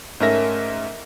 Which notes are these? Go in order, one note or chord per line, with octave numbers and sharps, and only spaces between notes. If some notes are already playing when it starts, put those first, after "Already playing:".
G#2 A3 C#4 A#4 E5 A#6